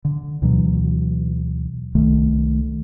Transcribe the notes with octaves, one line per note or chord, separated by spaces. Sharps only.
D3
D2 B2 E3 F#3
C2 D#3 A3